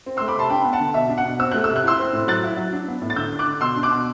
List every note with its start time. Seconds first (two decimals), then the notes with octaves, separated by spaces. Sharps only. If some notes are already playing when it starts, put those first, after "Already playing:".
0.06 C4
0.17 A3 C6 E6
0.28 B5 D6
0.36 C3 A5 C6
0.50 D4 G5 B5
0.65 B3
0.73 F#5 A5
0.80 D3
0.94 B2 E5
1.09 D4
1.18 F#5
1.25 B2
1.39 C4 E6
1.52 A3 F#6
1.64 C3 E6
1.76 F#6
1.84 E4 C6 E6
1.99 C4
2.13 A2
2.27 F#3 F#6 A6
2.43 E4
2.57 F#3
2.72 D4
2.88 B3
3.02 A2
3.10 A6
3.16 D3 E6 G6
3.32 D4
3.39 D6 F#6
3.46 D3
3.61 B2 C6 E6
3.76 D4
3.83 D6 F#6
3.91 B2